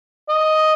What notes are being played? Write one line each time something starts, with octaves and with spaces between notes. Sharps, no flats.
D#5